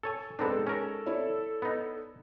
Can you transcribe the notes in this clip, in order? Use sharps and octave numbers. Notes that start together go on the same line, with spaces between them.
A4 C#5 G#5
G#3 B3 C4 D4 D#4 A4
C#4 A4 A#4
E4 C#5 D5
B3 D#4